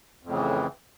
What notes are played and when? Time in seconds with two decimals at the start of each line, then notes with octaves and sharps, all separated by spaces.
0.23 F2
0.26 A2
0.30 C#3
0.33 E3